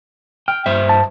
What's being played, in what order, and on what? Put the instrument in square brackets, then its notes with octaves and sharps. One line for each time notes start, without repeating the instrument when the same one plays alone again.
[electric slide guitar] G5 [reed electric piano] F6
[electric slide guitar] G2 C5 E5
[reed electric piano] A5